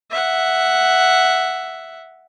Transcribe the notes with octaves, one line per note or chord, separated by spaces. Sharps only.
E5 F#5